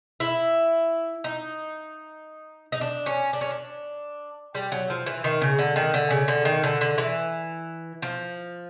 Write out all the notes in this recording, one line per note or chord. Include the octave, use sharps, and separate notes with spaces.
E4
D#4
D#4
D4
C#4
D4
C#4
D4
G3
F#3
F3
E3
D#3
C#3
D3
D#3
D3
C#3
D3
D#3
D3
D3
E3
F3